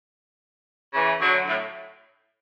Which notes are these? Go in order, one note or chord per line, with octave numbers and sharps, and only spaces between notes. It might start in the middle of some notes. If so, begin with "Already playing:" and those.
C#3 E3
D3 F#3
A2